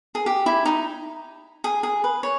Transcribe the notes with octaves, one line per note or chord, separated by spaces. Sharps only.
G#4
G4
E4
D#4
G#4
G#4
B4
C#5